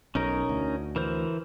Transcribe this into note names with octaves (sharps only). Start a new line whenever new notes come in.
B1 C#4 D#4 A#4
D2
E3 A#4 C5